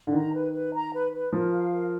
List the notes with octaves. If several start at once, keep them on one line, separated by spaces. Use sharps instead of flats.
D3
D#3 A#5
B4
B4
A#5
B4
B4
F3 A#4
F5
A#4